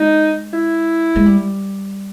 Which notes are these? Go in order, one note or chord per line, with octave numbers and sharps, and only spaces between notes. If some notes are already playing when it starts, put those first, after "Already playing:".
Already playing: G#3 D#4
E4
G#3
G3